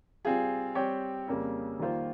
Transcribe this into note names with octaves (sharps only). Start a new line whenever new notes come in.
G3 C4 F4 G#4
G3 C4 G4 C#5
F2 C#3 G3 A#3
D#3 G3 A#3 F4 C5